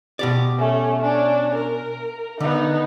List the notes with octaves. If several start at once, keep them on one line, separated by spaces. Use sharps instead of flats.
B2 G4 D5
A3 C#4
C#4 D4
A#4
D3 B3 D#4